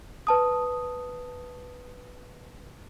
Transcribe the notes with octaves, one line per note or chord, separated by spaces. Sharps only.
B4 A5 D#6